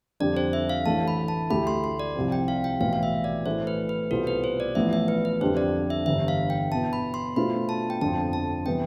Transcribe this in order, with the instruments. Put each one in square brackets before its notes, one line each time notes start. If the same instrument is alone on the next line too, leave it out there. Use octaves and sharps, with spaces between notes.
[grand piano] F2 D3 G3 D4 G4 [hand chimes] D5
[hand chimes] C5
E5
F5
[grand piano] A1 A2 E3 A3 D4 [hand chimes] A5
[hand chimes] B5
A5
[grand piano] D2 D3 A3 E4 G4 [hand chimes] B5
[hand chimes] C6
C6
D5
[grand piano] C2 C3 F3 C4
[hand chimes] G5
F5
G5
[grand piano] B1 A2 E3 [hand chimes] F5
[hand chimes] F5
E5
D5
[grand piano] A2 E3 A3 E4 [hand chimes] C5
[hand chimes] B4
B4
[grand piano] C2 B2 B3 F4 C5 [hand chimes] A4
[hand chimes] B4
C5
D5
[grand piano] A1 A2 F3 B3 [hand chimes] E5
[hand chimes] E5
B4
B4
[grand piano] F2 D3 G3 D4 G4 [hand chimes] C5
[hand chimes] D5
E5
[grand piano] G1 G2 E3 [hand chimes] E5
[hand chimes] F5
G5
[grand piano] B2 B3 E4 [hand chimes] A5
[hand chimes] B5
C6
[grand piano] B2 A3 D4 F4 C5 [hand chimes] B5
[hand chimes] A5
G5
[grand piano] G1 F2 D3 F3 [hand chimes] A5
[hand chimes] A5
[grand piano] C3 E3 G3 B3 [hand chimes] G5